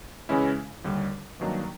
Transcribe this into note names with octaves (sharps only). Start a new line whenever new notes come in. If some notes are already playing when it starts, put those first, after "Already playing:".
C#3 E3 G#3 C#4 E4
D#2 D3 G3
G2 D#3 F#3 A#3 D4